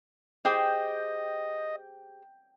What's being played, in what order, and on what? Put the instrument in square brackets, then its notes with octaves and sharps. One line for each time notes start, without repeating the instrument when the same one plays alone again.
[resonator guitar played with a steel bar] G4 G#4 C5 [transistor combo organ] D#5 [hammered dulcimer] G5